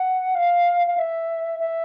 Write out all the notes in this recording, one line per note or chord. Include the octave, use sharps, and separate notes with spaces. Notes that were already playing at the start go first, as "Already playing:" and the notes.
Already playing: F#5
F5
F5
E5
E5